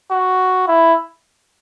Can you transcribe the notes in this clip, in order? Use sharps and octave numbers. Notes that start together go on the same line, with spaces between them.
F#4
E4